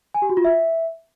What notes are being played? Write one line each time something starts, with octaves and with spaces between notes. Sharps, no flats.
G#5
G4
F#4
F4
E5